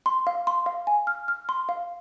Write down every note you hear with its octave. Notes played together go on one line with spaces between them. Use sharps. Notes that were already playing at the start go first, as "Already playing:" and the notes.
C6
F5
C6
F5
G#5
F6
F6
C6
F5